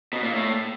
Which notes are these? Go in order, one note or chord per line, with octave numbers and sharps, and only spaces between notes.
B2
A#2
A2